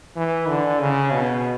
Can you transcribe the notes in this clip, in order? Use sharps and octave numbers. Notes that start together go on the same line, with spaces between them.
E3
D3
C#3
B2